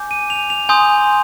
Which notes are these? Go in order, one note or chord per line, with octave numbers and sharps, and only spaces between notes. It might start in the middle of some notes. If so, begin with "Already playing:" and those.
Already playing: G#5 D6 G6
D#7
F7
F7
G#5 C6 D#6 G6